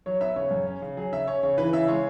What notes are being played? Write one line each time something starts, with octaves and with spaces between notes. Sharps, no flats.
F#3 C#5
B3 E5
C#3 C#5
F#2
C#4
C#3
F#3 G#4
C#3 E5
C#4 C#5
C#3 C#5
E3 B4
C#3 E5
G#3 C#5